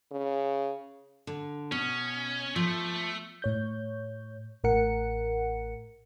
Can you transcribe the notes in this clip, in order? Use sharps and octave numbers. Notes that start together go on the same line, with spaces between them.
C#3
D3
B2 C#4
F3 A3
A2 C#5 G6
A1 A2 A#4 F#5 C#7